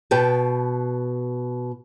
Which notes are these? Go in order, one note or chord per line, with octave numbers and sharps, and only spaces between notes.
B2 B4 G5 A5